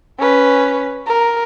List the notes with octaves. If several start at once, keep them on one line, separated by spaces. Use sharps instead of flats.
C#4 B4
A#4